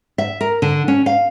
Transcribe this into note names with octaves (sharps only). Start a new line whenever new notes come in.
E5
A#4
D3
C#4
F5